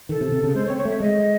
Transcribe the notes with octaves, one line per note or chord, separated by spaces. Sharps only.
D#3 A4
C3
C3
C#3
G#3 C5
C#5
C4
C#5
A3 E5
G#3 D#5